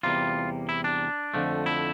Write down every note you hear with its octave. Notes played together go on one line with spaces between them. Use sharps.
E2 C3 G3 A#3 F4
E4
D4
F2 D3 F3 A3
E4